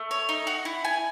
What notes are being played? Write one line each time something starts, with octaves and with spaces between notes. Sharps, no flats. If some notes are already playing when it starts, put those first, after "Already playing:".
Already playing: A3
C#5
D#4
F#4
E4
G#5